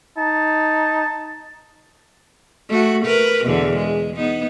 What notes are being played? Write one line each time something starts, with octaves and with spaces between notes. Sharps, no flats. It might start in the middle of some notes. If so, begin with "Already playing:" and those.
D#4 A5
A3 F#4
A#4 B4
E2 B2 D3
G#3
B3 D#4